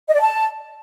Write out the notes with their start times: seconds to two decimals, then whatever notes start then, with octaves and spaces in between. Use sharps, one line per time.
0.08 D#5
0.14 D5
0.20 A5